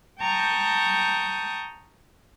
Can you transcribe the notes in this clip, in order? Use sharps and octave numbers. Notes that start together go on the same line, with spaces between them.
G5 A5 A#5 C#6 D#6 G6